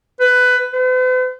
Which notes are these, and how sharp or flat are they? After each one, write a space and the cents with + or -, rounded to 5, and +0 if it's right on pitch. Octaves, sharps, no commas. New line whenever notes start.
B4 +15
B4 +45